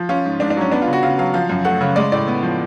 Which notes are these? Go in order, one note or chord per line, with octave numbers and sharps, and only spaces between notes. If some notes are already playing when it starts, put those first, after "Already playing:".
Already playing: F3
C#4 F4
G#2
G#2 D4
D4
F#3 C#4
B3 D4
F4
C#3
F#4
C#3 F5
F#3 F5
F3 F5
F#2
A3 F#5
C#3
G#3 D5
A2 D5
B3
F3